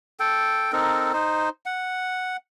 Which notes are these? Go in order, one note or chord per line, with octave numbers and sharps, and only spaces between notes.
A4 G5
C4 D#4 A4 A#4
D#4 C5
F#5